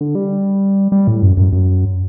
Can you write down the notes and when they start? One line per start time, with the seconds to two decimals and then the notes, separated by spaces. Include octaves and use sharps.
0.01 D3
0.15 G3
0.92 G3
1.08 A2
1.22 F#2
1.37 F#2
1.53 F#2